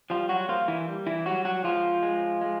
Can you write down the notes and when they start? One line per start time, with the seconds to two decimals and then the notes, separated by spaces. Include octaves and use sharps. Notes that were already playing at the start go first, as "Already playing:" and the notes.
0.10 F3 G3 F4
0.29 F#3 F#4
0.48 F3 A#3 F4
0.68 E3 E4
0.87 G3
1.07 E3 E4
1.26 F#3 G3 F#4
1.45 F#3 F#4
1.64 F3 G#3 F4
2.03 G#3
2.41 G#3